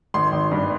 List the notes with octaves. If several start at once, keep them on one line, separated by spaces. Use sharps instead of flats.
G#1 C6
G#1
G2